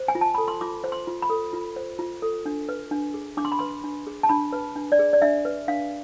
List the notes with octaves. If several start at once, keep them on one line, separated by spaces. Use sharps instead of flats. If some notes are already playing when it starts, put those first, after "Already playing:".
Already playing: C5
G#5
F4
A5
A4 B5
C6
F4 D6
C5
C6
F4
B5
A4
F4
C5
F4
A4
D4
B4
D4
G#4
D4 D6
C6
B5
B4 C6
D4
G#4
A5
D4 B5
B4
D4
D5
G#4
D5
D4 E5
B4
D4 F5